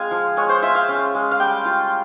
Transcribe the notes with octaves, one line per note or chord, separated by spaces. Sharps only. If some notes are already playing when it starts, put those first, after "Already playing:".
Already playing: G#3 C4 F4 F5 G#5
F3
G#3 C#5
C5
F4 E5
F5
C#4
G#3
F5
G3 G5
F4